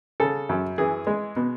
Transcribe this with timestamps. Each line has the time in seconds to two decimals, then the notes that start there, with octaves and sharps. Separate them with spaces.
0.20 C#3 A4
0.49 F#2
0.78 E3 G#4
1.07 G#3
1.36 B2